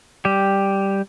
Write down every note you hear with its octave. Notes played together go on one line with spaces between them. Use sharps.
G3 G4